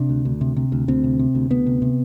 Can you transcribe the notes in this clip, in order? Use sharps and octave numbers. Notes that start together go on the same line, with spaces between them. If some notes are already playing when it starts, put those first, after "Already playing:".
Already playing: C3 D4
D2
D2
C3
C3
D2
D2 C4
C3
C3
D2
D2 B3
C3
C3